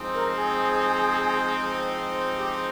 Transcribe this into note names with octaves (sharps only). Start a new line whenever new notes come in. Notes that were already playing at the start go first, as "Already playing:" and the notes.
Already playing: F3 G#3 C4 D#4
A#4
G#4
G4